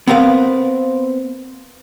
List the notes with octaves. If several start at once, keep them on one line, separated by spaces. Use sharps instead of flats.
B3 C4 A#4 B4 F5